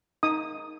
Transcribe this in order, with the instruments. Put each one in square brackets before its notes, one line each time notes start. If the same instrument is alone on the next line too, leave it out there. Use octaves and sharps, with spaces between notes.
[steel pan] D#4 D#6